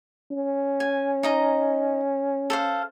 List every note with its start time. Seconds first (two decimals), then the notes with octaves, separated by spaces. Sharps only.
0.31 C#4
0.80 G#5
1.23 D#4 D#5 A#5
2.50 A4 C5 F5